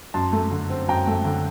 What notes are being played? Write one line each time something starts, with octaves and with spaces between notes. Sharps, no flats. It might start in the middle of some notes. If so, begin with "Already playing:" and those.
F#2 A5 C6
A3
D3
C4
F#2 G5 A#5
A3
D3